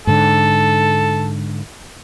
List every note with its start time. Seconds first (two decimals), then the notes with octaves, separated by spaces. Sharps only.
0.07 G#2 D3 A4